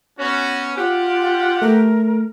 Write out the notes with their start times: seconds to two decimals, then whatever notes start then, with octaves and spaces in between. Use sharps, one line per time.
0.19 B3 C#4 F#4
0.77 F4 G4 F#5
1.62 A3 A#4